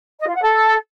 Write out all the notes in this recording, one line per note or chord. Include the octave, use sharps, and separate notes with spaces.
D#5
F4
F#5
A4